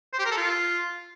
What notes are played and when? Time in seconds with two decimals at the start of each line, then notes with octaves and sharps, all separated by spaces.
0.13 C5
0.19 G4
0.25 A#4
0.31 A4
0.37 F4